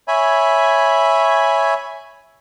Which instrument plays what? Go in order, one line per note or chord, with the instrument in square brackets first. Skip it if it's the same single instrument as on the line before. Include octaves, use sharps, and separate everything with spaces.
[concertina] C#5 E5 G#5 B5